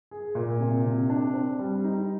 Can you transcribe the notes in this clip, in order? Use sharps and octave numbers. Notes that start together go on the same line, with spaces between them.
G#4
A#2
C3
C3
D4
C4
G3
D#4